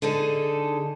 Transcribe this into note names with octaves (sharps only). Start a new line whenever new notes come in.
D3 D#4 G#4 A4